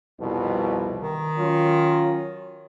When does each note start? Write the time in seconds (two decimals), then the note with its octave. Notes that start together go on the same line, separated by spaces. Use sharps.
0.19 C2 F2 B2
0.99 D#3
1.37 F#3 C#4 F4